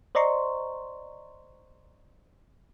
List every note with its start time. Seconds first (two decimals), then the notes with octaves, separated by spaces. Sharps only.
0.15 C5 D5 D#5 A#5 C6 C#6